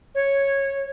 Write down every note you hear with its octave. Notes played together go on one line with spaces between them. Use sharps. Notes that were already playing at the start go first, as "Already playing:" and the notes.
C#5